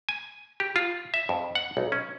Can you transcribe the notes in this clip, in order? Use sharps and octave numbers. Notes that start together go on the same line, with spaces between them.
G#5
G4
F4
E5
F2
F#5
B1
C#4